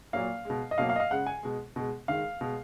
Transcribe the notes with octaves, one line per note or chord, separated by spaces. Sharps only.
A#2 F#3 A#3 F5
B2 G#3
D#5
B2 F#3 A#3 F5
F5
D#5
F5
C#3 G#3 F#5
G#5
B2 G#3
B2 G#3
D#3 G#3 F5
B2 G#3